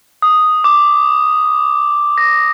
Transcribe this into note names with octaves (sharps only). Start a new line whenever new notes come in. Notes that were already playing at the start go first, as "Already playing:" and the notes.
D#6
D6
A#6